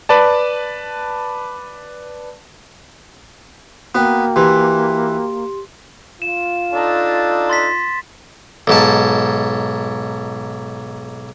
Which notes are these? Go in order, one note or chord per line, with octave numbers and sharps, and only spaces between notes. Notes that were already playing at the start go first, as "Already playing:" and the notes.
B4 D5 A5
A#3 B3 F#4 G5
E3 G4 C6
F4 E7
D4 D#4 A4
C6 A6 B6
B1 G#2 A5